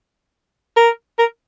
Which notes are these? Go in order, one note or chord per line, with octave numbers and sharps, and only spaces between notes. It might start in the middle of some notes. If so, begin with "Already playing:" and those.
A#4
A#4